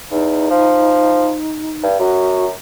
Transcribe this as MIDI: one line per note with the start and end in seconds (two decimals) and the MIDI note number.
0.11 0.50 40
0.11 1.86 63
0.50 1.35 53
1.83 1.96 43
1.99 2.52 42
1.99 2.44 66